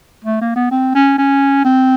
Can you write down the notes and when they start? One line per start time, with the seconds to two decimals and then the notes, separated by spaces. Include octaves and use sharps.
0.24 A3
0.41 A#3
0.56 B3
0.71 C4
0.95 C#4
1.18 C#4
1.64 C4